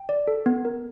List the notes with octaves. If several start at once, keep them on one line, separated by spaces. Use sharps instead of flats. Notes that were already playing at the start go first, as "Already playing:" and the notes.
Already playing: G5
D5
A4
B3
A#4